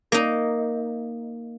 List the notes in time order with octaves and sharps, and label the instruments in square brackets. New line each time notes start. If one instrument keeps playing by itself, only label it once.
[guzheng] A#3 D#4